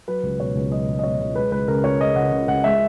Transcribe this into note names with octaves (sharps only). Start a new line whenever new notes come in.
F#3 B4
C#2
B2 C#5
C#2
F#3 D#5
C#2
D#5
B2 C#5
C#2
G#3 B4
C#2 B4
C#3 A#4
C#2 C#5
G#3 D#5
C#2 F#5
C#3
C#2 F#5
G#3 E5